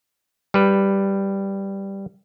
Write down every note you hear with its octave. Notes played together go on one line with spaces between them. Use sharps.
G3 B4